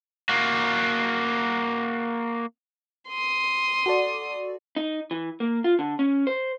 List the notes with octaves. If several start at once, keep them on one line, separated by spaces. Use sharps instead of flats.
A#3 F#4
C6 D#6
F#4 A4 D5
D#4
E3
A#3
F4
D3
C#4
C5